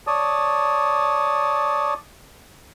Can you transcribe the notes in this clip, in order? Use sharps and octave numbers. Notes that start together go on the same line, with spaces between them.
C#5 D5 A5 D#6